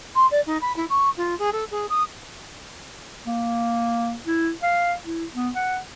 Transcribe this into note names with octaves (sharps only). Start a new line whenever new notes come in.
C6
D5
D#4
B5
E4
C#6
F4
G#4
A4
G#4
D#6
A#3
E4
F5
E4
B3
F#5